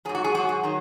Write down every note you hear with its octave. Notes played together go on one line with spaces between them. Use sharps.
G#2 F#3 G#4
F#4
G#4
G#2 F#3 F#4
G#4
D#3 F#3